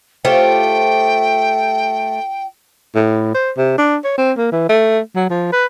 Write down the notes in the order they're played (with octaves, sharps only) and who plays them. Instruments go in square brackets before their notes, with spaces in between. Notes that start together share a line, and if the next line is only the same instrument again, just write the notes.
[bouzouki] A3 G4 [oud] F4 C5 C#5 [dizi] G5
[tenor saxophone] A2
C5
C3
D4
C#5
C4
A#3
E3
A3
F#3
F3
B4